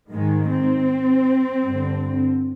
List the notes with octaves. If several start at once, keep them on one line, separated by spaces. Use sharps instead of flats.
G#2 D#3 G#3
C4
G2 D3